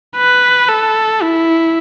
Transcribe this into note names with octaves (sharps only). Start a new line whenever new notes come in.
B4
A4
E4